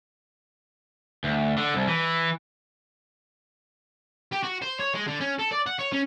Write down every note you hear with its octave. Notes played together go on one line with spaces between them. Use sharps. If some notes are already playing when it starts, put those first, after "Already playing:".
D2
D3
C2
E3
G4
F#4
C5
C#5
G#3
D3
C#4
A4
D5
F#5
C#5
C#4